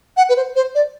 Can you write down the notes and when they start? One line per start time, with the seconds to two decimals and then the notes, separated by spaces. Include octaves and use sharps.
0.17 F#5
0.29 B4
0.36 C5
0.56 C5
0.75 D5